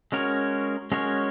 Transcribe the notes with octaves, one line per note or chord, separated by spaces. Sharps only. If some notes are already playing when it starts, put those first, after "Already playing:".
G#3 C#4 F#4 A#4 C#5
G#3 C#4 F#4 A#4 C#5